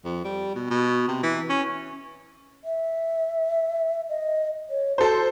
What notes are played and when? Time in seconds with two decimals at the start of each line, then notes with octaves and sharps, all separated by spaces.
0.05 F2
0.24 G3
0.55 B2
0.70 B2
1.08 C3
1.23 E3
1.49 C#4
2.64 E5
4.09 D#5
4.70 C#5
4.98 F#4 A4 C5